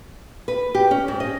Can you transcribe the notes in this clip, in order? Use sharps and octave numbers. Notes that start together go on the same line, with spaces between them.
B4
G4
C#4
G#2
D#5